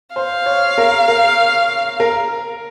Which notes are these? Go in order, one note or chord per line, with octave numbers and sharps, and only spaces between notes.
C5 F5
C#5
A#4
A#4
A#4